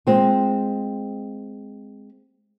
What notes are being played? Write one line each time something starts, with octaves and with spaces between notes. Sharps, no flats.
G#3 C4 F4